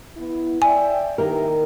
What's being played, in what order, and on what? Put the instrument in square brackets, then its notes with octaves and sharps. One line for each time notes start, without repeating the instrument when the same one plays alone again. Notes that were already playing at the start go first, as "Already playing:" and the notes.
[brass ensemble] B3 E4
[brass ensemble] D5 E5 G5 [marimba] G#5
[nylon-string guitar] D#3 A#3 A#4 [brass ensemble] E4 G4 E5